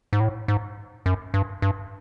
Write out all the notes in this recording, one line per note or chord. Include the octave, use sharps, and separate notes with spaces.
G#2
A2
G#2
F#2
G2
G2